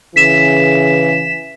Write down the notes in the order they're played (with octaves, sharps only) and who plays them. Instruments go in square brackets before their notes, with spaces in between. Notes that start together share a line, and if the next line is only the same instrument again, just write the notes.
[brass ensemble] C#3 E3 [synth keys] B6 E7